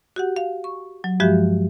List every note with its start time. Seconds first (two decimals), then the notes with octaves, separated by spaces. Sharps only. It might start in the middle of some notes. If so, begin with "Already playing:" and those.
0.16 F#4 G4 F#5
0.36 F5
0.64 C#6
1.04 F#3
1.20 G2 F3 G#3 F#4 G4 E5